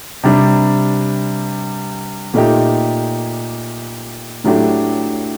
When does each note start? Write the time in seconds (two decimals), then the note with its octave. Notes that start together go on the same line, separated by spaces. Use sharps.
0.24 C3 G3 D4
2.34 A#2 A3 D#4 G4
4.44 A2 F#3 A3 D4 G4